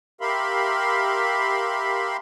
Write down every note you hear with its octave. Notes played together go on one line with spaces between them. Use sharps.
G4 A#4 E5 F5 B5 C6